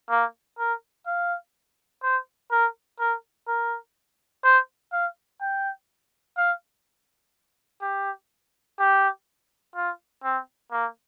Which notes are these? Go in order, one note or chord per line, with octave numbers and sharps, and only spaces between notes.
A#3
A#4
F5
C5
A#4
A#4
A#4
C5
F5
G5
F5
G4
G4
F4
C4
A#3